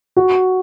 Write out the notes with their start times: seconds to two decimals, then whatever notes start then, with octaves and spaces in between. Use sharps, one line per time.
0.16 F#4